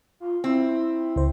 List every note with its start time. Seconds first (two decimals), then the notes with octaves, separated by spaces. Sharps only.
0.20 F4
0.44 C4 E4
1.16 C#2 C5